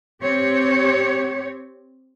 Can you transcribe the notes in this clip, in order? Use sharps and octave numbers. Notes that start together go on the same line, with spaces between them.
C4 G4 C#5